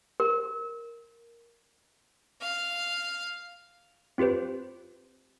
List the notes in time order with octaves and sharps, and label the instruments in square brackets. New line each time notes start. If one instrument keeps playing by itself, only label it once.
[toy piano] A#4
[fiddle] F5
[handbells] C4 F4 G4 B4 C5